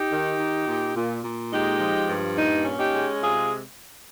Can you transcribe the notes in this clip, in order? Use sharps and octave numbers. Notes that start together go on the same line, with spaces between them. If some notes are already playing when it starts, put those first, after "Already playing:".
Already playing: D#4 G4
D#3
D#3
A#2
A#2
A#2
G#3 D#4 G4
F3
G2
A#2 D#4
C#4
D#4 G4
G#3
C3 F4 G#4